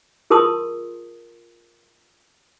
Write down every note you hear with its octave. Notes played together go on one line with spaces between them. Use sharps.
F4 G#4 A#4 A5 C6 D#6